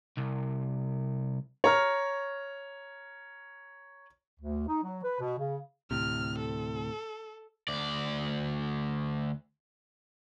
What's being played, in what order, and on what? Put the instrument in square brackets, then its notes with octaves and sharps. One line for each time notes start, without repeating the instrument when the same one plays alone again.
[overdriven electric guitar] C2
[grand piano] C#5 A#5 F6
[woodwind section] D2
D#4
F#3
B4
B2
C#3
[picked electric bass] D2 A2 C3 [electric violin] F6
[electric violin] A4
[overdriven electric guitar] D2 D5